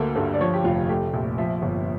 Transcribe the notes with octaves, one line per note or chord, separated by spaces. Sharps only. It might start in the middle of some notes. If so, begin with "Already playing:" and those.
Already playing: D2 A#3 A4
G2 A4
D5
F3 C#5
G4
F1 F4
A3 G4
A#1
F3 E5
G1